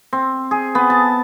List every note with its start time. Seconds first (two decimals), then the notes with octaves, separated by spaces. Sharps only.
0.13 C4
0.51 G#4
0.75 B3
0.90 A5